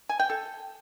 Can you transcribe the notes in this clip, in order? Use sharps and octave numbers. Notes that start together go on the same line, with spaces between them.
G#5
G5
A4